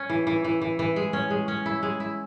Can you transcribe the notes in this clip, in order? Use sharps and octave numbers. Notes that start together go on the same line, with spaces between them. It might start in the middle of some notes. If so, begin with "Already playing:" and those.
Already playing: C#4
E3
E3
E3
E3
E3
G#3
C#4
G#3
C#4
E4
G#3
E4